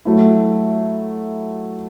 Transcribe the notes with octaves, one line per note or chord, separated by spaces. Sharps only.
F#3 A3 E4